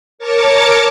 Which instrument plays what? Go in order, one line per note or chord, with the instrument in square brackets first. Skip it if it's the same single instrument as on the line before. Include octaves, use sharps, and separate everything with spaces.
[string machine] A#4 C#5 A5 C#6 D6 A6